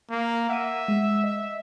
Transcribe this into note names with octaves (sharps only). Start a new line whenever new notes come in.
A#3
E5 F#5 D#7
G#3
D#5